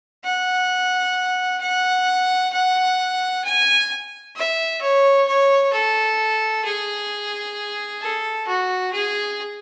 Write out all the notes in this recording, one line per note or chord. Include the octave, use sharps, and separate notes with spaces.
F#5
F#5
F#5
G#5
E5
C#5
C#5
A4
G#4
A4
F#4
G#4